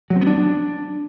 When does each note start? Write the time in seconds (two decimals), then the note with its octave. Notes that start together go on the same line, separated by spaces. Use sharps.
0.10 F#3
0.16 C4
0.21 B3
0.27 D4